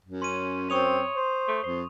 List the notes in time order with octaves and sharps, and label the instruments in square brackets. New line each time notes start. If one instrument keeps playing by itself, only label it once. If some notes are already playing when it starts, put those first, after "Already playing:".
[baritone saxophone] F#2
[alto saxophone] C#4 [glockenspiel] C6 D#7
[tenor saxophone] C4 [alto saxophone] C#5 [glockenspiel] C#6 D#6 F7
[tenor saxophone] C5
[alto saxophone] A3
[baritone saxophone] F2 [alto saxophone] C5